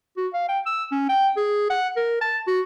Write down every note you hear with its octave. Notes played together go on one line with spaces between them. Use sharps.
F#4
F5
G5
E6
C#4
G5
G#4
F#5
A#4
A5
F#4